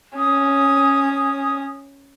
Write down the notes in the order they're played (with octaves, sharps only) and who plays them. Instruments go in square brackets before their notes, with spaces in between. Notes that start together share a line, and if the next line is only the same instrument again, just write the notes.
[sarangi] C#4 [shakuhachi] D#6